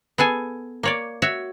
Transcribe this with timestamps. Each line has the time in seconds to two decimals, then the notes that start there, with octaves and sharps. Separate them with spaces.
0.18 B3 G#4 A4 G#5
0.83 A#3 C#5 D5
1.22 F#4 C#5 E5